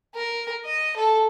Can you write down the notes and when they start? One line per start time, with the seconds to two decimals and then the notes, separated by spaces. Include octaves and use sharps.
0.15 A#4
0.65 D#5
0.97 A4